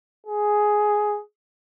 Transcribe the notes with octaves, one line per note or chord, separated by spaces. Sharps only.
G#4